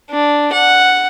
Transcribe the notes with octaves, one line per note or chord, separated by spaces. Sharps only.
D4
F#5